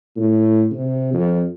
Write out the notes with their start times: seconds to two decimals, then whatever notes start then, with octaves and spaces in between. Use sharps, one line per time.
0.16 A2
0.71 C3
1.14 F2